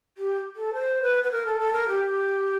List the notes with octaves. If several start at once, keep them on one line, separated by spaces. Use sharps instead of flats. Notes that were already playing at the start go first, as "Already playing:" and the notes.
G4
A4
C5
B4
B4
A#4
A4
A4
A#4
G4